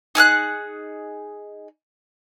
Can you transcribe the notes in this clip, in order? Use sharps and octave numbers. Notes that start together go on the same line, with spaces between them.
D#4 G#4 F6 F#6